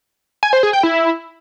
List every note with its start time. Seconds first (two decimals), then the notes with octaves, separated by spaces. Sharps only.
0.43 G#5
0.53 C5
0.63 G#4
0.73 G5
0.83 E4